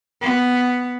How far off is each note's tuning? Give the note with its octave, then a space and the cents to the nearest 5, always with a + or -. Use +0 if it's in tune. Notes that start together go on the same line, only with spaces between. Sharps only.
B3 +5